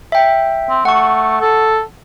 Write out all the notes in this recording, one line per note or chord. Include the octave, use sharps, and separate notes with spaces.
E5 G5
C4
A3 F#5 C#6
A4